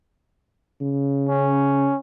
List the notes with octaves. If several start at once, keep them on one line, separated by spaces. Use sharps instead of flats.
C#3
C#4